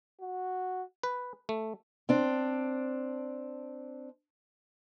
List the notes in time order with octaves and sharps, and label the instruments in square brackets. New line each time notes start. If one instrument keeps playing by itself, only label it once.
[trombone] F#4
[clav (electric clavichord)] B4
A3
[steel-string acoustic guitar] C4 D4